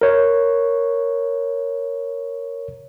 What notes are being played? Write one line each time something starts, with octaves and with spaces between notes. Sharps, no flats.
A#4 C#5